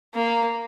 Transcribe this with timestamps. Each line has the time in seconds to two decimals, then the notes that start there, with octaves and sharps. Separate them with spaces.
0.14 A#3